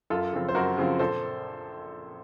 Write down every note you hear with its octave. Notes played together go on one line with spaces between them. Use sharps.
F#2 F4 A4
C#3 F3 C4 F4
C5
F#2 F#4 A#4
C#3 F3 C4 F4
A#1 A4 C5